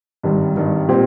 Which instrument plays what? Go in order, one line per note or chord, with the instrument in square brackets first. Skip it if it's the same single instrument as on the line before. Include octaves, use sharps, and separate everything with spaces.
[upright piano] G#1 G2 D#3 G3
G#1 G2 D#3 G3
A#2 G3 C4 G4